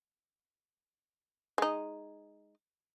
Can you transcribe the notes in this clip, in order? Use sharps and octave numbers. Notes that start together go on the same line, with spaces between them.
G#3 D#4